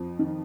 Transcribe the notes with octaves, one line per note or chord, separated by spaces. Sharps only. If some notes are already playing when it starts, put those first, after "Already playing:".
Already playing: F2 F3
D#3